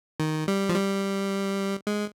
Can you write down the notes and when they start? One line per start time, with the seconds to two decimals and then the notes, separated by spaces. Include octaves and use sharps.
0.20 D#3
0.48 G3
0.69 F3
0.75 G3
1.87 G#3